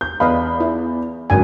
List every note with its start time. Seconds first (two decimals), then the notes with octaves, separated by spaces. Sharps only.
0.01 G6
0.20 E2 B4 D#5 F5 B5
0.60 E4
1.30 G#1 F#2 D3 G#5